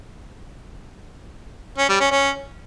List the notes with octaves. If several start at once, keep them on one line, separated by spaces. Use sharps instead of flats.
C#4
G3
C#4
C#4